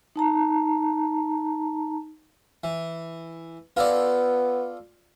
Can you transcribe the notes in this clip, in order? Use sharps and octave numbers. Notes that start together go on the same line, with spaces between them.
D#4 A5 A#5
E3
B3 F4 A4 D5